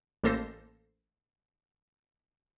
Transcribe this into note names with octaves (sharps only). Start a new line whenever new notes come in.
A1 A#3 A4 C5 A#6